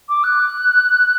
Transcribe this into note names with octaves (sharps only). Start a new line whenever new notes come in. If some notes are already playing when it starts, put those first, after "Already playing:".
D6
F#6